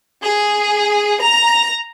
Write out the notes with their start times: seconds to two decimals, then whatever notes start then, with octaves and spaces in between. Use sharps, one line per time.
0.21 G#4
1.21 A#5